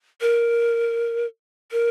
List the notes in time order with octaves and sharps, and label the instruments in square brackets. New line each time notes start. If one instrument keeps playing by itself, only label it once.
[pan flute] A#4
A#4